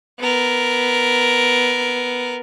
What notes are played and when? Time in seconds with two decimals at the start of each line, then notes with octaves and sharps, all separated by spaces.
0.20 B3 A#4